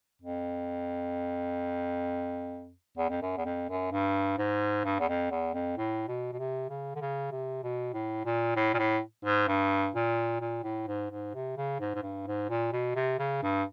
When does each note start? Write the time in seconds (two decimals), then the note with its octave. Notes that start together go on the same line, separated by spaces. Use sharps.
0.22 F2
2.97 E2
3.10 F2
3.22 F#2
3.37 E2
3.45 F2
3.69 F#2
3.92 G2
4.38 G#2
4.85 G2
4.99 E2
5.08 F2
5.31 E2
5.54 F2
5.77 A2
6.08 B2
6.33 B2
6.39 C3
6.70 C#3
6.95 D3
7.01 C#3
7.31 C3
7.63 B2
7.93 A2
8.25 A#2
8.56 A2
8.74 A#2
8.78 A2
9.25 G#2
9.48 G2
9.95 A#2
10.41 A#2
10.64 A2
10.87 G#2
11.11 G#2
11.34 C3
11.57 C#3
11.80 G#2
11.95 G#2
12.03 G2
12.27 G#2
12.49 A#2
12.72 B2
12.95 C3
13.19 C#3
13.43 G2